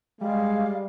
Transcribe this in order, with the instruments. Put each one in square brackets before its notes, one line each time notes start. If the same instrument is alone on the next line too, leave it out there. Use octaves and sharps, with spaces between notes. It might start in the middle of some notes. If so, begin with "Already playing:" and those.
[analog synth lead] G3 [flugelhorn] G#3 [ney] F5